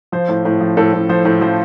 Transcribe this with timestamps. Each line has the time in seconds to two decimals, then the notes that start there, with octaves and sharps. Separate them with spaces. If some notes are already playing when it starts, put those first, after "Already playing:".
0.12 F3 C5
0.29 A2
0.45 A2
0.61 F3
0.77 A2 A4
0.93 A2
1.09 F3 C5
1.25 A2
1.41 F3 C5